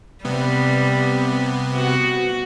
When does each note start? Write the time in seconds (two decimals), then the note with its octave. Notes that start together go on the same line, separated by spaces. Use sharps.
0.25 C3 G3 B3
1.75 F#4